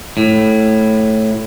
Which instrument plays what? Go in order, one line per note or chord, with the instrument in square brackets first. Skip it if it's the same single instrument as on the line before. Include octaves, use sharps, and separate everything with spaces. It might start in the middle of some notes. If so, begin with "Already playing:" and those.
[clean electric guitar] A2